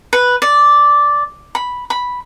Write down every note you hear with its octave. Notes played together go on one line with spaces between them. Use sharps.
B4
D5
B5
B5